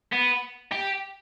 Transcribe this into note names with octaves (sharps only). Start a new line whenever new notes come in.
B3
G4